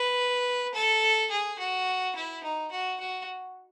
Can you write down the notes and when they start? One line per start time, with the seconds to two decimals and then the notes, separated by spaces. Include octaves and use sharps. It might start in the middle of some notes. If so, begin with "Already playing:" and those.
Already playing: B4
0.74 A4
1.31 G#4
1.59 F#4
2.16 E4
2.44 D#4
2.72 F#4
3.00 F#4